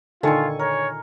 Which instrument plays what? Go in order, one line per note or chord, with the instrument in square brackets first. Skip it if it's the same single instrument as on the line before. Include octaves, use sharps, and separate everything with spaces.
[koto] A#2 D#3 [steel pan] D3 A4 [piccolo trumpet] F4 [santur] G#5 C#6
[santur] A#4 [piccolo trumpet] C#5